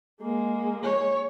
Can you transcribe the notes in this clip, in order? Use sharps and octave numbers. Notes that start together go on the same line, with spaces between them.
G#3 A#3
C#5